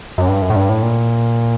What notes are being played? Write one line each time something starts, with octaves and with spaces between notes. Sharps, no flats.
F#2
G2
F#2
A2
G2
A2
A#2